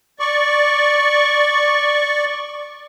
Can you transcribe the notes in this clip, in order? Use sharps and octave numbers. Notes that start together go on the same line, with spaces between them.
D5 C#6